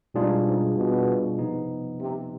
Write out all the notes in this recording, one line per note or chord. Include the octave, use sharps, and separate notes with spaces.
G#2 B2 G3 D4 F4 G#4
G#2
B2
C3 F3 B3 D#4
C3